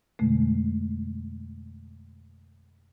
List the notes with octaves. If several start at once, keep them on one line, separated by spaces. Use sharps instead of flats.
F2 B2 D3 G#3 A3